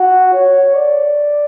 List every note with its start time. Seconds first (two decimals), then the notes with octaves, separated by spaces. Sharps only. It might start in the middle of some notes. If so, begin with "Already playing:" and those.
Already playing: F#4
0.33 C#5
0.75 D5